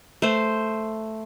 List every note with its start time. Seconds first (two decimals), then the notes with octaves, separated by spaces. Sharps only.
0.22 A3 C5